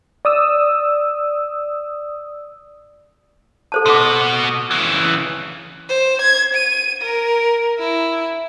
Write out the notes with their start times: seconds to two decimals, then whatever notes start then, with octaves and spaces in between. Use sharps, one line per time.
0.25 D5 D#6 E6
3.72 A4 C5 A5
3.86 B2 F#4 C6 D6
4.71 C#3 E3
5.89 C5
6.22 G#6
6.55 D#7
7.02 A#4
7.79 E4